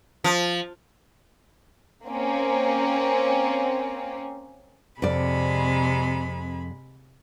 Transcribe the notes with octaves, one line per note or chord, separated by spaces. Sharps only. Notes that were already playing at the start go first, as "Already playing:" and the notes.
F3
A#3 C4 C#4
F2 C3 G#3 D5 B5